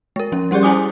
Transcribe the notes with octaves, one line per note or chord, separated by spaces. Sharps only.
G#3 A#4
F3 C#4
G3 C#4 G4 G#4 D5
E4 C5 G#5 D6 D#6